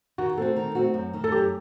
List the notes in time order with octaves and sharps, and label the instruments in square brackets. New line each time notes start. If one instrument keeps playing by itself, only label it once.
[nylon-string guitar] D#3 [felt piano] F#4
[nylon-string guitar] A3 C4 F#4 [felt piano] A4
[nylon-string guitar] D#3
A3 C4 F#4
F#2
D#3 A3
[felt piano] A4
[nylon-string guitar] F#2 [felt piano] G4